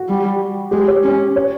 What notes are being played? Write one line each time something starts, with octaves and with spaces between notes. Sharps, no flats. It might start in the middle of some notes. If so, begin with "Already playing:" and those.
Already playing: F#4
G3
G#3 G4
C#5
C#4
C#5